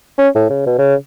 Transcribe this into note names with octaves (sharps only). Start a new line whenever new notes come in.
C#4
A2
C#3
B2
C#3